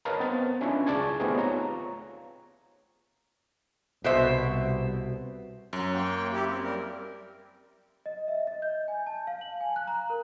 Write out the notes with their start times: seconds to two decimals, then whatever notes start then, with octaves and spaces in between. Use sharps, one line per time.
0.05 A#4 B4 C#5 D#5 F5 A5
0.20 B3 C4 C5 A6
0.61 C#4 D4 E4 F4 C#5
0.87 C#2 G#4 D5 A5 C#6 G#6
1.20 A3 B3 C4 D#4 G4 G#4
1.37 F4 C#5 A#5
4.04 C2 B2 C5 E5
5.73 F#2 F#3
5.94 A#3 G5
6.33 E4 G4
6.50 C4
6.64 G3 A#4
8.06 D#5
8.28 E5
8.47 D#5
8.62 G6
8.88 G#5
9.07 A5
9.27 F5
9.41 F#7
9.61 G#5
9.76 F#6
9.88 A#5
10.10 A#4